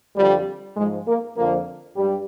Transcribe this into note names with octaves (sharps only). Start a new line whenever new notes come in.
F2 D3 F3 G3
G#2 F3 G#3
A#3
F2 D3 F3 A#3
G2 G3